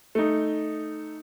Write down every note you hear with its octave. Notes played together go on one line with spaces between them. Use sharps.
A3 D#4